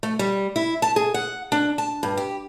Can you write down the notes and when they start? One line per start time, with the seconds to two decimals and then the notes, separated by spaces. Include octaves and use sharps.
0.03 A3
0.19 G3
0.56 E4
0.82 A5
0.96 G#4
1.14 F#5
1.52 D4
1.78 A5
2.03 G2
2.17 G4